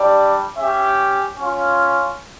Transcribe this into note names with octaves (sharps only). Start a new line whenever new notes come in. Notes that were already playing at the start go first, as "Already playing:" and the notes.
Already playing: G3 D4 G4 D5
C#4 G4 E5
C#4 F4